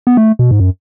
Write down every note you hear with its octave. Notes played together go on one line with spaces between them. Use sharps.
B3
A3
B2
G#2
F#2